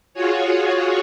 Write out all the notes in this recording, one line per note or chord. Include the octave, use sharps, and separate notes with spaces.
F4 F#4 G#4 C#5